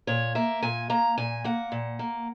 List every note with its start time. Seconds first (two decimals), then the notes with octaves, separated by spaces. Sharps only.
0.07 A#2 C#5
0.35 A#3 E5
0.62 A#2 G#5
0.90 A#3 A#5
1.18 A#2 G#5
1.44 A#3 F#5
1.72 A#2
1.99 A#3